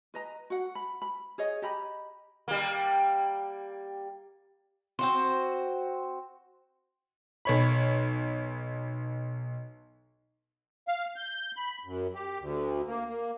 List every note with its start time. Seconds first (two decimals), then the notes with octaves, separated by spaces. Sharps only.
0.14 B4 D#5 A#5
0.50 F#4 F#5
0.75 B5
1.02 B5
1.38 G#4 C#5 D#5
1.62 G4 D#5 A#5 B5
2.48 G3 A#3
4.99 C4 F#4 C5
7.45 B1 C#5 B5
10.88 F5
11.16 G6
11.56 B5
11.85 F#2
12.14 G4
12.39 D2
12.87 A#3
13.08 A#3